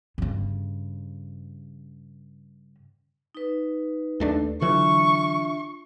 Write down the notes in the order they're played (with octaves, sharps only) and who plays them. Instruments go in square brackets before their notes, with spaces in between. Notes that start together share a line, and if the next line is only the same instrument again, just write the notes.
[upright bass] G2 C#3
[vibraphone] D#4 B4
[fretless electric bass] D#2 A3 D4
[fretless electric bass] D3 E3 F#3 [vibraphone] D4 F4 E5 [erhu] C#6